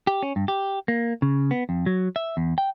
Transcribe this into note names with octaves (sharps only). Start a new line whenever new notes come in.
G4
C#4
G2
G4
A#3
C#3
B3
F2
F#3
E5
E2
G5